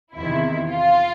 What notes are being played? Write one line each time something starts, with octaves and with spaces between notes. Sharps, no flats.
E2 C3 D#3 E4
F4